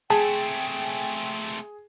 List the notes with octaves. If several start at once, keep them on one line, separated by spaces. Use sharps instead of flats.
A3 C4 G#4 G5 A5